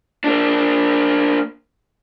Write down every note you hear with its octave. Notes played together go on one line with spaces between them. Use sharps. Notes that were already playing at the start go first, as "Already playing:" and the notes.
A#3 D4